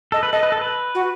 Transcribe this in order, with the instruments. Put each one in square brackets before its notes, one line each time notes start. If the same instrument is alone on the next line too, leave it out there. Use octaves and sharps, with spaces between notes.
[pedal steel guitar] A4 [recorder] D#5
[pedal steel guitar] B4
[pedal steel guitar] A4 [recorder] D#5
[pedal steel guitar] B4
A4
B4
[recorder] F#4